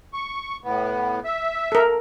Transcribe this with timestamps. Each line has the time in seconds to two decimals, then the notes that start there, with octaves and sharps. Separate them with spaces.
0.13 C#6
0.64 A2 B3
1.24 E5
1.72 A4 A#4